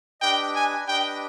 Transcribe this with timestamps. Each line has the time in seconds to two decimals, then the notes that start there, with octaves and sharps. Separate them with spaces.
0.21 D4 G4 B4 D#5 G5
0.55 G#5
0.88 D4 G4 B4 D#5 G5